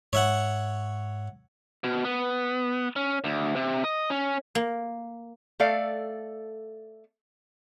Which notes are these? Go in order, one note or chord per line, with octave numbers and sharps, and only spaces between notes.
G#2 C#5 E5 F#5
B2
B3
C#4
D2
C3
D#5
C#4
A#3
A3 A4 D5 F5